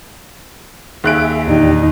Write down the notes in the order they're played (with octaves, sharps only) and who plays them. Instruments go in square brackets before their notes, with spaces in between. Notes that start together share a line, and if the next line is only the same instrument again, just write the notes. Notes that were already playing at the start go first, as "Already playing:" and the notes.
[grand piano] D#2 F#6 D7 [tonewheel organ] G#4 E5
[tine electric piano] E2 A#2 D#3 [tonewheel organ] D4 G4 [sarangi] D#4